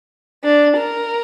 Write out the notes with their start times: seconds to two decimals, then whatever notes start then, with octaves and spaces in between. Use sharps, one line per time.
0.44 D4
0.77 A#4